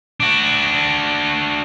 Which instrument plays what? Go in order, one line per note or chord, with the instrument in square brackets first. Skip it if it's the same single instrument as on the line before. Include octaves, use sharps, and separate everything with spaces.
[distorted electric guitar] D4 F#4